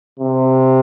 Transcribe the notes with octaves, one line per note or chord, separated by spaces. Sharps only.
C3